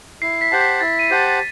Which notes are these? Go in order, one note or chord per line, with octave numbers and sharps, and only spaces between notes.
E4 C7
B6
G4 C5 F#5 A5 C7
B6
E4 A6
D#7
G4 C5 F#5 A5 C7
B6